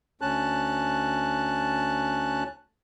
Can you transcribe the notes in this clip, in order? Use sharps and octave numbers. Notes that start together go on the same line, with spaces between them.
D2 C#4 A5 F#6